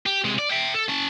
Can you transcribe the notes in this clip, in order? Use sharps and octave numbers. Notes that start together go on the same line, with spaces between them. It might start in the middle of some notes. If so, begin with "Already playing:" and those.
G4
C3 G#3
D5
E5 G5
A4
C#4 A5